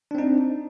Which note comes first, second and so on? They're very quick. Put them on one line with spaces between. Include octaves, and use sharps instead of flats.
D4 C4 D#4